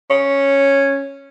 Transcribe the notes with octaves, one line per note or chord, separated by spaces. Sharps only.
C#4